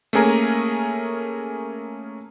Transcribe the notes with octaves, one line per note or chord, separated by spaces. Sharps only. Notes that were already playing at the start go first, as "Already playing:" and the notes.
A3 A#3 C#4 G#4 A#4